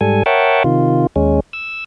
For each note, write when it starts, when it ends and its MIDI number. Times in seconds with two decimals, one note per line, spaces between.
0.01 0.23 44
0.01 0.23 55
0.01 0.23 69
0.01 0.23 80
0.26 0.63 70
0.26 0.63 73
0.26 0.63 76
0.26 0.63 78
0.26 0.63 79
0.26 0.63 81
0.64 1.07 48
0.64 1.07 51
0.64 1.07 65
1.16 1.40 39
1.16 1.40 56
1.16 1.40 61
1.53 1.84 88